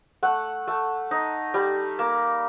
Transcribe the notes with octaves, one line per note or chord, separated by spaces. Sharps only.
A3 F#5
A3
D#4
G3
A#3